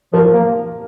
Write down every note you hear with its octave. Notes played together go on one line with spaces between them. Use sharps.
F3 A#4
A#3